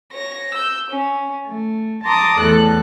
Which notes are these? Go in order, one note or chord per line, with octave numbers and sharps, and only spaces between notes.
C#5 A#6
E6 G6
C#4
A3
A5 A#5 C6 D6 D#6
E2 A2 A4 F#6